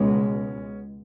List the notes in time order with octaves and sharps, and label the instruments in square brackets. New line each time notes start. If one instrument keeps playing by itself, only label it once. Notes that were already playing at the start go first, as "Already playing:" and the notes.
Already playing: [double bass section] C#2 B2 G#3 [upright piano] C#4